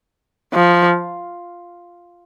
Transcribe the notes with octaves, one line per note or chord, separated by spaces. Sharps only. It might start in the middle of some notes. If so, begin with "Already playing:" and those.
F3